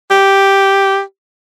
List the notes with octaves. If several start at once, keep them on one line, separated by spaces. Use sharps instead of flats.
G4